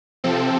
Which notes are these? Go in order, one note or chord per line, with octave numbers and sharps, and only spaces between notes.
C3 F3 C4 A4